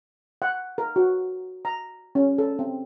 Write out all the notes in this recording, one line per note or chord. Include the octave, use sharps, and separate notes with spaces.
F#5
A#4
F#4
A#5
C#4
A4
C4